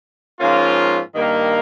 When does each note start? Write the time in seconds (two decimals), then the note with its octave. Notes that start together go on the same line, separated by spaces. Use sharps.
0.39 G#2 F3 A#3 C#4 F4
1.15 G2 D#3 A#3